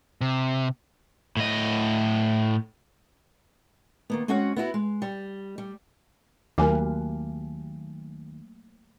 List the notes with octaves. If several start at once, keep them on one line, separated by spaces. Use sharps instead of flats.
C3
A2 D#5
D#3 A#3 B3
G#3 C4 C#4 F#4 C#5 F#5
B3 E4 F#4
G#3
G3
G3
D#2 F#3 A3 A#3 A#4 G#5 D6